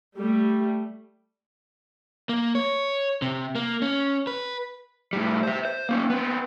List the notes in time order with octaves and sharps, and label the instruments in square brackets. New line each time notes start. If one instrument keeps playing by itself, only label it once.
[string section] G3 A3
[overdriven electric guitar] A#3
C#5
C3
A#3
C#4
B4
A2 G3
C5 E5
C5
A#3 C#4
B3 C4